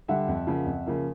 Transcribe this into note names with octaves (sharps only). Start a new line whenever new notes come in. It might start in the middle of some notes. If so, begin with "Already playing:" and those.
D3 G3 E5 F#5
F2
C#3 F3 A#3
F2
C#3 F3 A#3